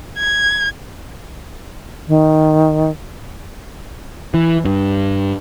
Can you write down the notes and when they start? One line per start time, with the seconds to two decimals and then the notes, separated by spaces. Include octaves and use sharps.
0.18 G#6
2.08 D#3
4.34 E3
4.65 G2